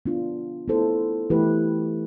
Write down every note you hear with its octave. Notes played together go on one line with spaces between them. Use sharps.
B3 D4 F4
B3 E4 A4 C5
E3 A3 E4 G4 B4